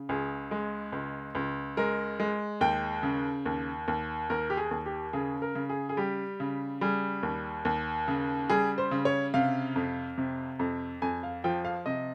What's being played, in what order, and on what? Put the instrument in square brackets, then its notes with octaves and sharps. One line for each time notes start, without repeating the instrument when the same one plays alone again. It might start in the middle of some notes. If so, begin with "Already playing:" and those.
Already playing: [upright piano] C#3
C#2 G#4
G#3
C#2
C#2
G#3 A#4
G#3
D#2 G5
C#3
D#2
D#2
D#2 A#4
G4
G#4
D#2
G4
C#3 G#4
A#4
C#3
G#4
G#4
G3 G4
C#3
G3 G#4
D#2
D#2
C#3
G3 G#4
C5
C#3
C#5
C3 F5
F2
C3
F2
F2 G#5
F5
F3 G5
F5
C3 D#5